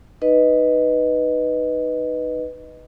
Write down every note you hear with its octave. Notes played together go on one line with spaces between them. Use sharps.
D#4 B4 D#5